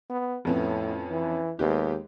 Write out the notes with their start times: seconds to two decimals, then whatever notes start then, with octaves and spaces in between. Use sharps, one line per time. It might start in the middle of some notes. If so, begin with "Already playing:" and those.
0.10 B3
0.45 F2 A2 B3 C#4
1.11 E3
1.59 D#2 G#3 B3 G4